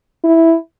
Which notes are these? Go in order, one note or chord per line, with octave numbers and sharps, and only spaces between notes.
E4